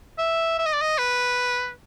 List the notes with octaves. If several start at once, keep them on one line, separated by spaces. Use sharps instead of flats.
E5
E5
D#5
D5
D#5
B4